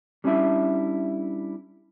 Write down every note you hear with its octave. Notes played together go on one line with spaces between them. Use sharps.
G3 C#4 D4 E4 E5